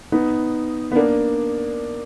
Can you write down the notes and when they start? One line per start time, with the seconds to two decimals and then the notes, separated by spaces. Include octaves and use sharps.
0.12 B3 D#4
0.92 B3
0.95 A#3 D4